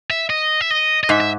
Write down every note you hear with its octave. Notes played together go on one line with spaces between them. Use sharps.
E5
D#5
E5
D#5
D#5
G#2 E5
E5